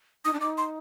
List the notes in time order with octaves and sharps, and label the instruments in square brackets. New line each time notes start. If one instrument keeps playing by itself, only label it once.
[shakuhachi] D#4 [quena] D#6
[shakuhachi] D4
[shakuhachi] D#4 [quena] D6
[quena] C6